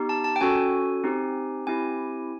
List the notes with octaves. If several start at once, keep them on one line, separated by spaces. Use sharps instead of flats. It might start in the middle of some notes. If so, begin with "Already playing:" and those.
Already playing: B3 D#4 G4
A5
A5
G5
C#4 F#4 A4 G#5
C4 D#4 G4
C4 E4 G4 G#5